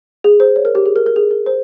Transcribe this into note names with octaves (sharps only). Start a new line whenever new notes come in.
G#4
C5
C#5
A#4
G4
G#4
A#4
A#4
G#4
A#4
C5